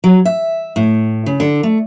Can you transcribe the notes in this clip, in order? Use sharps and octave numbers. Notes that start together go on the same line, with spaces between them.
F#3
E5
A2
C#3
D3
A3